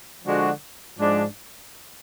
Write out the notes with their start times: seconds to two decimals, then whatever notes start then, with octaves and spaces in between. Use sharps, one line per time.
0.24 D3 F3 G#3 D4 F#4
0.98 G#2 F3 G#3 D4